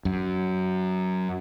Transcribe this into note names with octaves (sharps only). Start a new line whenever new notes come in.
F#2